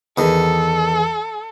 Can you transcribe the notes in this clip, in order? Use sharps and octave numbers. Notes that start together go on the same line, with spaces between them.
E2 D#3 A4